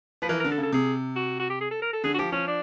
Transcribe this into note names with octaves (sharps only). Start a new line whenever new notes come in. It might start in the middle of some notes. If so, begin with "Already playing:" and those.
F3 B4
E3 A#4
D3 A#4
A4
C#3
A4
C3 G#4
F#4
F#4
G4
G#4
A4
A#4
A4
D3 G#4
F#4
F3 G4
F3 C#4
D4